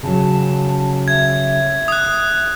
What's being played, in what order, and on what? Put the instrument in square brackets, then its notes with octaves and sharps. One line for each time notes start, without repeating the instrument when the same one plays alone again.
[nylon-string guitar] C#3 F#3 [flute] A5
[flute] E5 [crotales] G#6
[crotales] D#6 F#6